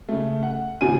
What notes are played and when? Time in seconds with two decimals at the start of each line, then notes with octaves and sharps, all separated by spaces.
0.09 C#3 A3
0.43 F#5
0.81 G#1 A#2 C#3 G#5 D#7